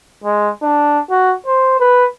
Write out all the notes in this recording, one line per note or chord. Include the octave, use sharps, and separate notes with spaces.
G#3
D4
F#4
C5
B4